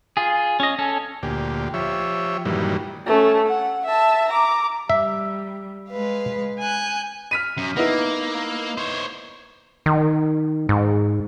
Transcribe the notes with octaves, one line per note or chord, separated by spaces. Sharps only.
F4 G#4
C#4 D#5
C#4 A4
D2 A#2 G4
F3 G4 C#5 E5
G2 A#2 D#3 E3 F#3 G3
A3 C#4
F#5
E5 A5
A#5 D6
G3 E5
G#3 B4 F5
G#5 F#6 G6
F6 B6 D#7
F#2
A#3 B3 D#4 E4
C5 C#5
D#3
G#2